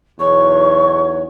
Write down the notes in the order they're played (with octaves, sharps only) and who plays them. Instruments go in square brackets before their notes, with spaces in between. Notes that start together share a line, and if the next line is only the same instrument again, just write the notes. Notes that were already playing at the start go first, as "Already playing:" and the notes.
[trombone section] B1 E2 [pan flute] C#5 [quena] C#6